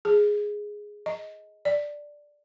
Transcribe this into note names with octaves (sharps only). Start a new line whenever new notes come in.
G#4
D#5
D5